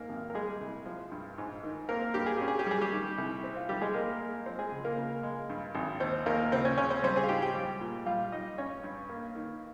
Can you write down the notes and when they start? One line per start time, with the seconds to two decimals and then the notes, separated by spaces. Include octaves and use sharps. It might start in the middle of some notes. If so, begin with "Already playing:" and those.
Already playing: G#2 A#3 A#4
0.09 G#1
0.30 A#4
0.34 G3 G#3 G#4
0.61 C2
0.86 F3
1.12 G2
1.38 G#2
1.63 D#3
1.89 A#3 C4 A#4
2.14 G2 G4
2.26 G#4
2.37 C#4 G4
2.48 G#4
2.59 G4
2.66 G3 G#4
2.81 G3 G4
2.92 D#3
3.18 C2
3.44 C4
3.57 F4
3.69 D#3 G3 G4
3.81 G#3 G#4
3.94 G#3 A#3 A#4
4.20 G#3
4.46 F3 C4 C5
4.59 G#3 G#4
4.72 C#2
4.85 A#3 A#4
4.97 C#3
5.23 G#3
5.50 G2
5.75 G#1
6.00 D#2 C4 C5
6.26 D#2 A#3 A#4
6.52 C#2 C4 C5
6.65 C#4 C#5
6.77 C#3 C#4 C#5
6.90 C4 C5
7.03 G3 C4 C5
7.16 G#4 G#5
7.23 F5
7.29 G#2 G4 G5
7.42 G4 G5
7.55 G3
7.81 A#2
8.06 G3 F4 F5
8.32 G3 D#4 D#5
8.58 G2 C#4 C#5
8.84 G2
9.09 A#3
9.35 D#3